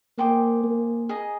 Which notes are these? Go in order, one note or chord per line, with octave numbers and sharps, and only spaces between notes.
A#3 G#4 C5 G5 D6
A#3
G#4 D#5 A#5